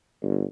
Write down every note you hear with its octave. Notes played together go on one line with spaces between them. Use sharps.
G1